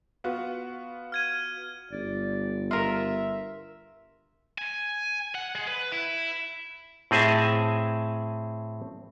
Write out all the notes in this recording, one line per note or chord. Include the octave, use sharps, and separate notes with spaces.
B3 F4 F#4
F6 G#6 D#7
G1 D5
F4 A#4 E5
G#5
F#5
G#3
B4
E4
A2 C4 G#4 D#5 E5 A5